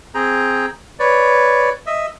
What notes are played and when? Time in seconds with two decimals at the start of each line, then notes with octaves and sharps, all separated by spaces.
0.14 C4 G#4 G5 A#5
1.00 B4 C#5 D5
1.86 D#5 E5